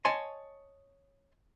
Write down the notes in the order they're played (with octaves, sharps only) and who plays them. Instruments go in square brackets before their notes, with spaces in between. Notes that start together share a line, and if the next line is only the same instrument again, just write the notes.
[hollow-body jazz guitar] C#5 D#5 G#5 A5 C6